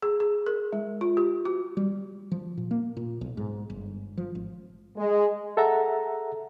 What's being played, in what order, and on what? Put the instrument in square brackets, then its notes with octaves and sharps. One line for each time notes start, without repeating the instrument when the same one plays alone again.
[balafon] G#4
G#4
A#4
G#3
F4
G4
F#4
[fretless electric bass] G3
F3
A#2
A#3
A#2
B1
G#2
G1
F3
G#1
[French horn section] G#3
[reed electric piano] G#4 A4 E5 F#5 A#5